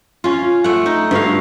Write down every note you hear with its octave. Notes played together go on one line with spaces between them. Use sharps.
C#4 F4
A3 F#5
D#4
G2 D3 F#4 F5